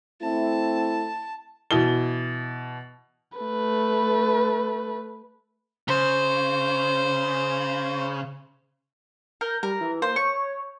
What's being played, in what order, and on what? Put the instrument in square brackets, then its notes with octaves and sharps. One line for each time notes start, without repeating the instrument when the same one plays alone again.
[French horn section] A3 C4 E4 [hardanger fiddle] A5
[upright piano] B2 E3 G7
[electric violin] A3 B4
[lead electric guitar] C#3 [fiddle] C5
[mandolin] A#4 [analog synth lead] G6
[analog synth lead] G3 [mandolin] A#4
[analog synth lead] E3
[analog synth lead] A#3 [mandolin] C5
[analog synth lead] C#5 [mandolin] C#6